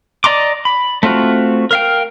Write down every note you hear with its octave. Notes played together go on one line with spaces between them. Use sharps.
D5 D#5 A#5 C6 D6
B5
A3 C4 F4 F#4
A#4 F5 G5